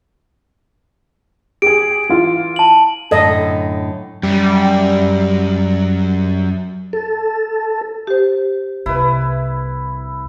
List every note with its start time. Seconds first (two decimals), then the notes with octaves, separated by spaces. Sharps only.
1.62 G4 G#4 D7
2.09 E3 F4
2.56 A5 F#7
3.11 F#2 A2 D3 A4 D#5
4.23 F#2 G3
6.93 A4
8.07 G4 C5
8.86 C2 E4 B4